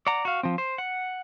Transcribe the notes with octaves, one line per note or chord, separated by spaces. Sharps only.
D5 F#5 A#5
F#4 F5
F3 C4
C5
F#5